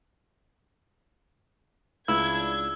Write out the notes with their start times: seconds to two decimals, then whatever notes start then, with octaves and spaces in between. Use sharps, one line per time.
2.08 C#2 D4 E4 E6 G#6